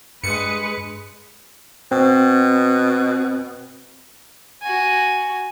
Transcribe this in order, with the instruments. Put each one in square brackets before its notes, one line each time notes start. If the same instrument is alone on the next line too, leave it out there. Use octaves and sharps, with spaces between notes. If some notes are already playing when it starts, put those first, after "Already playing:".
[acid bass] G2 [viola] G#3 B4 [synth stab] C#7
[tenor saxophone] B2 [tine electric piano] C4
[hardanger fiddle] F#4 G#5